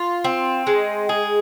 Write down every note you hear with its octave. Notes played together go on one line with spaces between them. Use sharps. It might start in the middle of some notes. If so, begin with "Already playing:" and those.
Already playing: F4
C4
G#3
G#4